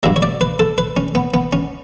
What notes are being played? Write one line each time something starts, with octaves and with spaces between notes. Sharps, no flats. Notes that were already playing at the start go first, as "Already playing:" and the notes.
G2 F#3 E5
C#5
D5
B4
A4
B4
C#4
B3
B3
C#4